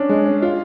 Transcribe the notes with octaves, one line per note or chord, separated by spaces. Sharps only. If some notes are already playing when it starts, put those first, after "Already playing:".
Already playing: C#4 D4
G#3
C#4
F4